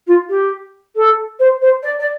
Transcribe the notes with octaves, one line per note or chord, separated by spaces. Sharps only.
F4
G4
A4
C5
C5
D5
D5